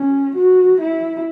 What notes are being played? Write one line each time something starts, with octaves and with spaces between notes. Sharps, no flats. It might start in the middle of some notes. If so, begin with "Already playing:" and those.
Already playing: C#4
F#4
E4